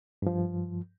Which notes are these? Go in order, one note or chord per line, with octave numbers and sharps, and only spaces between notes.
G2 F3